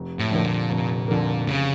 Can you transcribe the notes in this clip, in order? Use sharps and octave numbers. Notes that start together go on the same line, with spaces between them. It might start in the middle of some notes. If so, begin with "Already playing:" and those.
Already playing: F1
A2
F2 D3 F3 A#3
A#2
F1
F2 D3 F3 A#3
F1 C#3